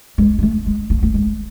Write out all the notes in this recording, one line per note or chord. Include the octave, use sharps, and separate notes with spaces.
G#3
G#3
A3
G#3
A3
A3
G#3